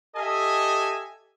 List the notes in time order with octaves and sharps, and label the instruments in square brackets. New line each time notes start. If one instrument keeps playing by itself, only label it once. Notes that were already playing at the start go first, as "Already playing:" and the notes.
[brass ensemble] G4 A4 D#5 E5 G#5